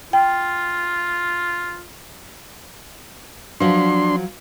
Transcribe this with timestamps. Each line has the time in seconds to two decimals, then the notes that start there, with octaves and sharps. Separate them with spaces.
0.13 F4 G5
3.60 F3 F#3 D4 C6